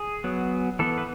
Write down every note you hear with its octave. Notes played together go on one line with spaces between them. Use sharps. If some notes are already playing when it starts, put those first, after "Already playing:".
Already playing: G#4
F#3 B3
E3 B3 A4
B4